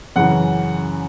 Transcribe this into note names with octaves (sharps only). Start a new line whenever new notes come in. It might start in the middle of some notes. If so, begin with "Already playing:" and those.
F#2 C#3 E3 F#5